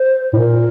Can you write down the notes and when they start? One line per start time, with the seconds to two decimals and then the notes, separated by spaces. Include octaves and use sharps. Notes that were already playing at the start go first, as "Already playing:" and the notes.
Already playing: C5
0.33 A2
0.37 A#2 A#4